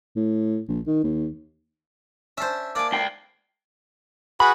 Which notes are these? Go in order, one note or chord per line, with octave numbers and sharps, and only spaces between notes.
A2
A#1
D#3
D#2
C#4 D4 C5 E5
A#3 D4 D5 G#5 D6
C#2 G5 C7
F#4 G#4 B4 B5